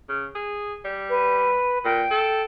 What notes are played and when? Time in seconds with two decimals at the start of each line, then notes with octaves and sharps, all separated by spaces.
0.09 C#3
0.35 G#4
0.85 G3
1.10 B4
1.85 A#2 G5
2.11 A4